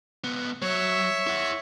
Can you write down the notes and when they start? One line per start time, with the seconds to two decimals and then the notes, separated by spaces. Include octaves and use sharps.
0.24 C#2 B3
0.62 F#3 C#5 E5
1.27 E4 F#5